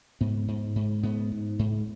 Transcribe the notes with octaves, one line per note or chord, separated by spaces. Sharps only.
G#2 B3
G#2
G#2
G#2 B3
G#2
G#2